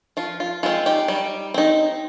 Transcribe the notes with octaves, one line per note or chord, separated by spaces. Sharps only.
F3 F4
F4
G#3 C4 F4
D#4 G4
G3
C4 D#4